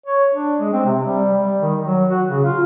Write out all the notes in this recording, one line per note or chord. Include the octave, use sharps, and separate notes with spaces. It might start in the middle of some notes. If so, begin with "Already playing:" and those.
C#5
D4
G#3
C4
C3
G3
G3
D#3
F#3
F#4
C#3
F4